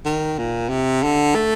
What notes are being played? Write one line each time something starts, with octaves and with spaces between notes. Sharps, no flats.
D#3
A#2
C3
D3
A3